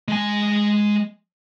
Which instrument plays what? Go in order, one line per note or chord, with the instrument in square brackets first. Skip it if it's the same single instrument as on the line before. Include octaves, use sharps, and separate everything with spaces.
[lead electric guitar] G#3 G#5